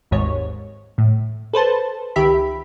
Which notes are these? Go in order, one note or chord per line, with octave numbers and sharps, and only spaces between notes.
G#1 D#2 G#2 C#5
A2
A4 B4 C5 A5
C#2 D#3 G4 E5 B5